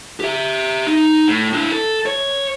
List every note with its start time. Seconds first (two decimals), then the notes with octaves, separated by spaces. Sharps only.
0.20 G4 E5
0.87 D#4
1.28 A2
1.53 D4 E4
1.72 A4
2.06 C#5